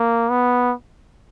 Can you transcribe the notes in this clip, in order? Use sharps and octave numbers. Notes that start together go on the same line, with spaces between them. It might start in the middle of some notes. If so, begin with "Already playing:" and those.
Already playing: A#3
B3